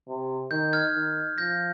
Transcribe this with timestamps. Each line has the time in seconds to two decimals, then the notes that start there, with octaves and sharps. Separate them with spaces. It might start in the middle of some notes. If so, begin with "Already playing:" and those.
0.08 C3
0.51 D#3 G6
0.73 F6 G#6
0.95 D#3
1.38 F3 G6 A#6